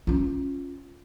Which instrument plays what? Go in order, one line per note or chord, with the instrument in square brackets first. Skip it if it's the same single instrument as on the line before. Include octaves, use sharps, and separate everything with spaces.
[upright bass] C#4 F4